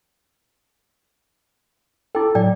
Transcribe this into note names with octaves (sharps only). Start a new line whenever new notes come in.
E4 A4 G5 D6
A2 F#3 D5 G5